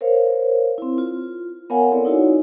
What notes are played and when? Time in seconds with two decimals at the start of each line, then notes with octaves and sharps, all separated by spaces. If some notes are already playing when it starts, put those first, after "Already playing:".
0.01 A#4 C5 C#5 F5
0.78 C4 E4
0.98 F4
1.70 B3 A#4 C#5 F5 F#5 G#5
1.92 C4 E4 A4 A#4 C#5 D5
2.05 D#4 E4 F#4 C#5 D#5